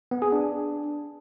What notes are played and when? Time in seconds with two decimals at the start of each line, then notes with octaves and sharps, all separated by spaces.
0.11 B3
0.22 G#4
0.33 D4